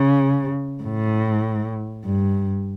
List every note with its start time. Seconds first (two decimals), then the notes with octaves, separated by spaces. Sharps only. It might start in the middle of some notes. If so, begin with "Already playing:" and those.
Already playing: C#3
0.83 A2
2.05 G2